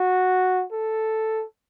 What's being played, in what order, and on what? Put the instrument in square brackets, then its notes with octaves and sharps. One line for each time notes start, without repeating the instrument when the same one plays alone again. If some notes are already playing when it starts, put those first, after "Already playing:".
Already playing: [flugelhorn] F#4
A4